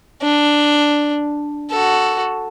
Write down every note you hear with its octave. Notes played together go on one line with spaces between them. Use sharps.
D4
F#4 A4